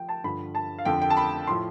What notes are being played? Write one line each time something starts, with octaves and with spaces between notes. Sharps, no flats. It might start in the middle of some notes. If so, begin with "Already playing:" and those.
Already playing: F3 G5
A5
G2 D3 F3 B5
A5
F5
F2 D3 F3 G5
G5
A5
B5
A2 F3 C6